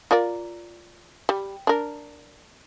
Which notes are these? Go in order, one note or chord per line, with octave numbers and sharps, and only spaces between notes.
F4 A#4 D5
G3
D4 A#4